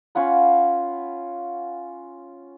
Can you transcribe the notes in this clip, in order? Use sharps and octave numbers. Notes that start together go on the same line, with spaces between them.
C#4 F4 F#5 B5